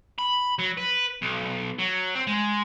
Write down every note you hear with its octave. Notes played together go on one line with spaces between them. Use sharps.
B5
F#3
B4
B1
F#3
C4
G#3